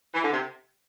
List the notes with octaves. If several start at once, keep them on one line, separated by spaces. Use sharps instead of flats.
E3
D3
C3